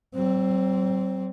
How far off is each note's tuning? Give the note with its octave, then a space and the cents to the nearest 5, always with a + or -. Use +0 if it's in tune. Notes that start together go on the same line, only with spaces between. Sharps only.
F#3 +45 C4 +0